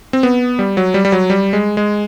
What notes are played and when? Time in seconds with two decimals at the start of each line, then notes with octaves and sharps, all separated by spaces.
0.13 C4
0.23 B3
0.59 G3
0.77 F#3
0.94 G3
1.05 G3
1.12 F#3
1.30 G3
1.53 G#3
1.77 G#3